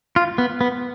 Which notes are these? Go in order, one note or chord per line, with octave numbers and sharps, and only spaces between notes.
F4
B3
B3